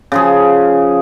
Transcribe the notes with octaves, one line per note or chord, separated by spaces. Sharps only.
C#3 F3 G#4